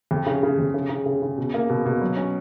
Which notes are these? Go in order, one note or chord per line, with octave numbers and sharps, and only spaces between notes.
F2
C#3
C#3
F2
C#3
C#3
C#3
C#3
B2
A#3
B2
B2
F#3
C#4